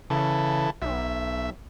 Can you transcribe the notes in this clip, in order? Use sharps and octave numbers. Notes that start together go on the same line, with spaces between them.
C#3 E3 A4
B1 E5